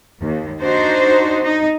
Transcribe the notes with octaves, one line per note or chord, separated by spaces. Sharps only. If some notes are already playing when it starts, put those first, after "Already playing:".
D#2
D4 D#4 F#4 C5
D#4